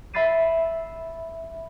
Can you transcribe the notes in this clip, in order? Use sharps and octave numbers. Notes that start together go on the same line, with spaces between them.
E5 B5 E6 A6 C7 D#7